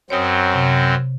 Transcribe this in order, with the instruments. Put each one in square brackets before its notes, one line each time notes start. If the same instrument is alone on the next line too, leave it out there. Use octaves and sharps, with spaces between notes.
[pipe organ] F#2 F#3 C4 [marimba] C#5 D#6
[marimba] C3